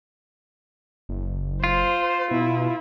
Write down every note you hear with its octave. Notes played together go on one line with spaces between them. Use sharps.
F#1
F4 C5
B2 E4